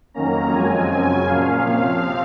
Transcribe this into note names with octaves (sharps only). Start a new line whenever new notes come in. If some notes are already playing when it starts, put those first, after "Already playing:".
F2 D#3 F#3 A#3 C#4 A#5
F#2 F3 G#3 C4 G#5
F#2 C#3 F#3 C#4
A#2 F3 A#3 C#4 F5
C3 F3 C4